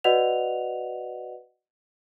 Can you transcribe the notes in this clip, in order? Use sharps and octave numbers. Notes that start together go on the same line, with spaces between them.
F#4 B4 D5 D#5 F#5 F7